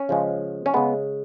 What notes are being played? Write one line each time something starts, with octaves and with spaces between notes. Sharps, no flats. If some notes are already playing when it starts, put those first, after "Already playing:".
Already playing: C#4
C#3 F3 G#3
C#4
C#3 G#3 B3